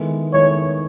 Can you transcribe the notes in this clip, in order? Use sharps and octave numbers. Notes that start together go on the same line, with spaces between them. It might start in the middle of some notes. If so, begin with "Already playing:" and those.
Already playing: D#3 G#3 B3 E4 A4
D#3 G#3 B3 E4 A4 C#5